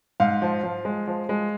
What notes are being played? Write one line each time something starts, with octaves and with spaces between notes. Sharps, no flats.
G#2 F5
F3
F3
G#3
F3
G#3